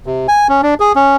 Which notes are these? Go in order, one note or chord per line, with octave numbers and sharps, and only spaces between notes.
C3
G#5
C#4
D4
G#4
C#4